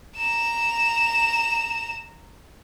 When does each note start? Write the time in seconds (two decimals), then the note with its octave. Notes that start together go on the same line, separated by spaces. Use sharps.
0.17 A#5 E7